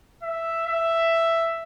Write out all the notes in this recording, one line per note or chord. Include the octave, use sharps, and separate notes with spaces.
E5
E5